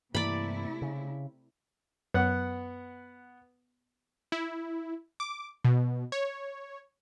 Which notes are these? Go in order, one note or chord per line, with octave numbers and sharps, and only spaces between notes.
G2 C3 E3 A3 A#3 E4 D5 B5
C#3
F#2 B3 F#5 F#6
E4
D6
B2
C#5